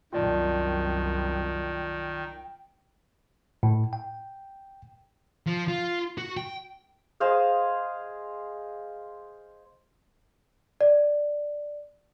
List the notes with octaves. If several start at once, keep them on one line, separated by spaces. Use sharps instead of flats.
C2 F#2 D#3 F4 D5 G5 A5
A2
G5
F3
F4
F#4
G5
G#4 C5 D#5 F5
D5